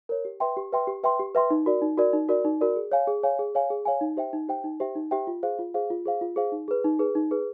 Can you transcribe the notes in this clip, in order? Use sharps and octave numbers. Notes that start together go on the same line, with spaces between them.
A#4 C#5
G4
B4 E5 G5 C6
G4
B4 E5 G5 C6
G4
B4 E5 G5 C6
G4
B4 E5 G5 C6
D#4
F#4 A#4 D5
D#4
F#4 A#4 D5
D#4
F#4 A#4 D5
D#4
F#4 A#4 D5
G#4
C#5 F5 G#5
G#4
C#5 F5 G#5
G#4
C#5 F5 G#5
G#4
C#5 F5 G#5
D#4
G4 C5 E5 G5
D#4
G4 C5 E5 G5
D#4
G4 C5 E5 G5
D#4
G4 C5 E5 G5
F4
G#4 C5 F5
F4
G#4 C5 F5
F4
G#4 C5 F5
F4
G#4 C5 F5
D#4
G#4 B4
D#4
G#4 B4
D#4
G#4 B4